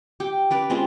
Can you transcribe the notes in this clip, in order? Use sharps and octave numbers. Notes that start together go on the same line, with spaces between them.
G4
C#4 B4 D5
G#3 C4 C#4 F4